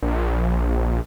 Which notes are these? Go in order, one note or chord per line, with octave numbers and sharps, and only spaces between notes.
A#1